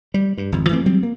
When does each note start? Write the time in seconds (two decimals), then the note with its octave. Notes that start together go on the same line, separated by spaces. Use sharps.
0.14 G3
0.38 G2
0.52 G#1 F2
0.69 E3 A3 C4
0.86 F#3 G3 C4
1.03 A#3